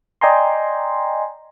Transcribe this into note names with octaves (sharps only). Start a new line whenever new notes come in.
D5 D#5 G5 G#5 A#5 C6